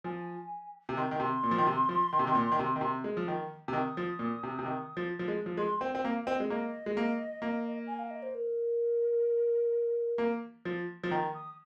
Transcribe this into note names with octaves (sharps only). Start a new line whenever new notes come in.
F3 G#5
C3
D#3 C6
D#3
C3
A#2
F3
D#3
C3
F3
D#3
C3
D#3
A#2
D#3
C3
D#3
C3
G#3
F3
D#3
C3
D#3 D#6
F3
A#2
C3
C3
D#3
F3
F3
G#3
F3
G#3 C6
C4
C4
A#3 F5
C4 D#5
G#3
A#3 D#5
G#3
A#3
A#3
G#5
F5
D#5
C5
A#4
A#3
F3
F3
D#3 A#5
D#6